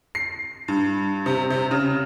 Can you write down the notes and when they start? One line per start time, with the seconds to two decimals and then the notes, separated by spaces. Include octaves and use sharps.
0.15 C7
0.68 G2
1.26 C3
1.50 C3
1.71 C#3